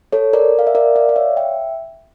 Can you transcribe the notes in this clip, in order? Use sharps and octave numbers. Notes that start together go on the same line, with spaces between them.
A4 C#5
A#4 D5
F5
E5
A#4 D5
D5 F5
F5
C#5 E5
E5 G5